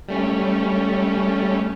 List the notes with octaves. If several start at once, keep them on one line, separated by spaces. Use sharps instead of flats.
G3 A3 C#4